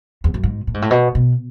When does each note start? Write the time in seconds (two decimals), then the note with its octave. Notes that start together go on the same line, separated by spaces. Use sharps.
0.24 E2
0.34 F#2
0.43 G#2
0.67 A2
0.74 G#2
0.82 A2
0.91 B2
1.15 B2